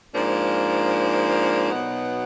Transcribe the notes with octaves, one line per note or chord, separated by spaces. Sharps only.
G#2 F3 A#3 D4
B2 F#3 B3 D#4